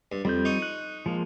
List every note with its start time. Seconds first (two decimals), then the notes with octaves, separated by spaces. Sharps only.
0.12 G2
0.25 F2 G3 C4 G6
0.45 D#4 C#6 D#6
0.62 F#6
1.06 F3 G#3 A#3